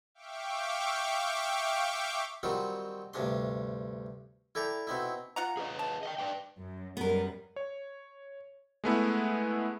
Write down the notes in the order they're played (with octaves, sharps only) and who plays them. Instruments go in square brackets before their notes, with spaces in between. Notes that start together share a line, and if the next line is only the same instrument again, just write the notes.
[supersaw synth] E5 F5 G5 C#6 D6
[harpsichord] D#3 F#3 G3 C4 D#4 F4
D2 G2 C3 D4 C6
E4 A4 D5 G5 A#5
B2 C4 D#4 E4
[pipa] F4 F#5 A#5
[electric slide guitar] G#4 B4 D#5
[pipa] A5
[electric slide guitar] D#5 F#5 G5
B4 D5 G5
[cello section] F#2
[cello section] F#2 G3 [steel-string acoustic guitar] B3 A#4
[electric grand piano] C#5
G#3 A3 B3 E4